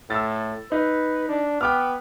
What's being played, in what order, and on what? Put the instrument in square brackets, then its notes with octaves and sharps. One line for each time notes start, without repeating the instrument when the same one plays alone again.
[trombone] A2 [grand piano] E6 A6
[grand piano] D#4 [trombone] B4
[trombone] D4
[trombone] B3 [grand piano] G5 D6 F6